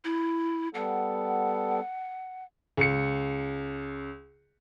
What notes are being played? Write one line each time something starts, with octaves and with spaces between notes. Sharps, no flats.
E4
G3 B3 A4 F#5
C#2 C#7